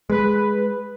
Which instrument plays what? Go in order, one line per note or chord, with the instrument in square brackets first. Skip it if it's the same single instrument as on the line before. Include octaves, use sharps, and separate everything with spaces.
[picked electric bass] G#3 [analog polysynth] B4